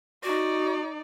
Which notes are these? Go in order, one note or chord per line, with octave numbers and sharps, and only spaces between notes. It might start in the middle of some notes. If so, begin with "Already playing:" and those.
D#4 F#4 D5